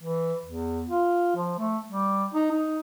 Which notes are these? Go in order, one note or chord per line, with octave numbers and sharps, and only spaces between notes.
E3
E2
F4
F3
A3
G3
D#4
D#4